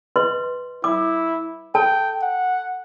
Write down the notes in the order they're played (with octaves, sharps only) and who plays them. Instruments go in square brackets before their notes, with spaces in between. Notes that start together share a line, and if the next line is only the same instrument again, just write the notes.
[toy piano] B4 D#5 C6
[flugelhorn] E4 [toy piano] D6
[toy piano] A4 A5 [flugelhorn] G5
[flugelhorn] F#5